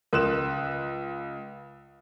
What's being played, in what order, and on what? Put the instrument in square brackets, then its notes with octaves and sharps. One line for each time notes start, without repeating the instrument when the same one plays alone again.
[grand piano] C#2 F#6 E7 [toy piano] A#4 C6 D#6